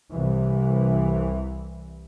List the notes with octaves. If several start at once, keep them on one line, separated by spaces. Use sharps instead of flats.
C2 E3